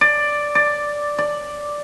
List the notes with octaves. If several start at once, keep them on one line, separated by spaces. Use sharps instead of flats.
D5
D5
D5